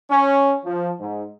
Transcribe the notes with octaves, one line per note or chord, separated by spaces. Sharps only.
C#4
F3
G#2